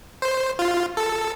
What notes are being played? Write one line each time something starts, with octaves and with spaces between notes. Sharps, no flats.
C5
F4
A4